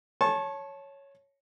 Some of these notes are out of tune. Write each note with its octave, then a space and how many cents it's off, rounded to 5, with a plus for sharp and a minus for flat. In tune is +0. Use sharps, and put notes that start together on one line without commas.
C#5 +0 A5 -15 C#6 -35